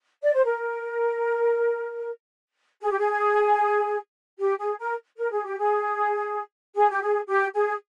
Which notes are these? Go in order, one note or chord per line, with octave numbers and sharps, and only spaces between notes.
D5
C5
A#4
G#4
G4
G#4
G4
G#4
A#4
A#4
G#4
G4
G#4
G#4
G4
G#4
G4
G#4